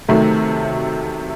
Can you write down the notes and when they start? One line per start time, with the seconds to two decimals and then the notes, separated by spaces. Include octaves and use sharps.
0.09 C3 D#3 F#3 A3